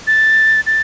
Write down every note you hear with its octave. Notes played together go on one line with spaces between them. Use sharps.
A6
A6